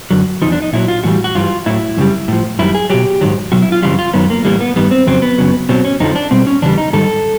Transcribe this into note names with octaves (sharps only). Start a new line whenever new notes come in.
F#2 D3 F#3
E2 C3 F3 D#4
D4
D#4
A#2 F#3 E4
F4
A2 E3 G3 F#4
F#4
G2 E3 G3 F4
A2 F#3 E4
F#2 C#3 G3
A2 F3
F#2 D#3 G3 E4
G#4
B2 F#3 G4
G#2 D#3 F#3
B2 F#3 F#4
E4
F4
F#2 C#3 E3 G3 F4
F4
F#2 D#3 F#3 B3
A#3
A2 E3 G3 A#3
B3
G2 D#3 G3 B3
C4
F2 C#3 F#3 C4
B3
F#2 C#3 F#3
B2 F#3 C4
C#4
F2 D3 F3 D#4
D4
B2 G3 C4
C#4
E2 C#3 E3 G3 D4
D#4
G#2 D#3 G3 A4